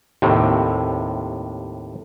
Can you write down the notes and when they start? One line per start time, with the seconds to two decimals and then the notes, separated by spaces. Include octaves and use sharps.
0.22 D#2 A2 C3